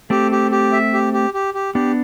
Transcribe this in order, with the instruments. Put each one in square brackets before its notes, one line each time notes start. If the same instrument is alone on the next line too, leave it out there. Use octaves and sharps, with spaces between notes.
[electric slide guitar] A3 C4 [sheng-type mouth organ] G4
[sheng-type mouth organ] G4
G4
E5
G4
G4
G4
G4
[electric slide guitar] B3 D4 [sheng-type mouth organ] G4